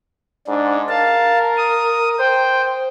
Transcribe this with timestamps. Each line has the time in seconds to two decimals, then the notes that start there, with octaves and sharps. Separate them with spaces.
0.48 G#2 D4
0.89 A#4 F5 A5
1.57 D#6
2.19 C5 G5